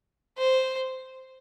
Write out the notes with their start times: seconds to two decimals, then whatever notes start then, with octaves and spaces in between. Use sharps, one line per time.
0.38 C5